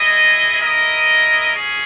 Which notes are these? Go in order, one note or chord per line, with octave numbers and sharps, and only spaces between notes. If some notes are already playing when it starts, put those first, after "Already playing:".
Already playing: E4 G#4 D#5
E4 A#4 D#5
C#4 G#4